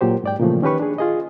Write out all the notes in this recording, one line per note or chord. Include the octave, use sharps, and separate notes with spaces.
A#2 F#3 G4 C5
G#2 D5 G5
A#2 C#3 E3 F3 A3
D#3 C#4 G4 B4 C#6
D4 G#4
F4 G#4 D#5